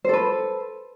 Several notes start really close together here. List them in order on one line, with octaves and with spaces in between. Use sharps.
C5 A4 B4